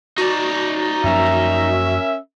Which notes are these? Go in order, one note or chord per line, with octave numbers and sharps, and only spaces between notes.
D#4 F#4 D5
F#2 F3 A#3 C#4 A#4 E5